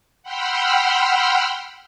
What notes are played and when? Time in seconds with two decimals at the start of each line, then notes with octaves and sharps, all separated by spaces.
0.23 F#5 G5 B5 C6 E6 F6